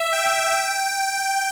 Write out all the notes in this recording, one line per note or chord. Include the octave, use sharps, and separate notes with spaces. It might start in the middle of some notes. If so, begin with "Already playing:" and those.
Already playing: E5
G5
G5